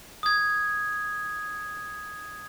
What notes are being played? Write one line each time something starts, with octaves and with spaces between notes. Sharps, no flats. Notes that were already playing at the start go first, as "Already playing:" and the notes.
D#6 G#6